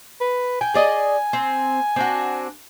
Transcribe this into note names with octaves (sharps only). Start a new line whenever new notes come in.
B4
G5 G#5
G#4 D5 D#5
C4
C4 D4 F#4